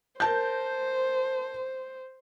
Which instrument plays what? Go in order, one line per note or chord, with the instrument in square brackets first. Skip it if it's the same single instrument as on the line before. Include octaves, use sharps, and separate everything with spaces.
[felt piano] A#4 A5 G6 [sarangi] C5